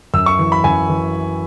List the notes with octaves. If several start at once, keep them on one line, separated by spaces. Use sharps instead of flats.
F#2 E6
C#6
E3
B5
F#2 G#5
E3